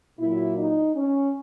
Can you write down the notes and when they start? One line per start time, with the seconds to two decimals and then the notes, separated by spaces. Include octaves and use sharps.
0.18 A#2 F#3 E4
0.57 D#4
0.95 C#4